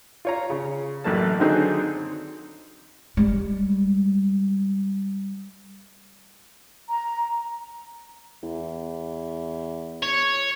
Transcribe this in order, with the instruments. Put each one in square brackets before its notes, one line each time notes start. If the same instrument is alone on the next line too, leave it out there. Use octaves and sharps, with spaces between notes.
[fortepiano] F4 C#5 A#5
C#3
A1 F#2 A3 A#3 A5
D3 D#3 F#3 C4 D#4 G#4
[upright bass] G3 G#3
[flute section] A#5
[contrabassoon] E2
[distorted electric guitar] C#5